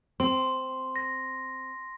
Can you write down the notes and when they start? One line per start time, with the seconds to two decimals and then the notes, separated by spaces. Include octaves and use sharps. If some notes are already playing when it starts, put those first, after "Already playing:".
0.20 C4 C6
0.96 A#6